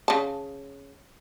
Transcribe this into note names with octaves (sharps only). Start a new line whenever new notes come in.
C#3 A5